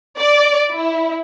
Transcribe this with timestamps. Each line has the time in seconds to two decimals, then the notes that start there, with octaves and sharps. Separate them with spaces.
0.18 D5
0.73 E4